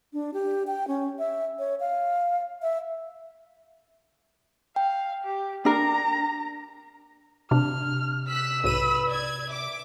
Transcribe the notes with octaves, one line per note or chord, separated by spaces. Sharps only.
D4
G4
G5
C#4
E5
C#5
F5
E5
F5 G5
G4
D4 A#4 A#5
C3 D4 F6
E6 F#6 B6
B1 G#2 B4 B5 D#7
D5 G#6
E5 D6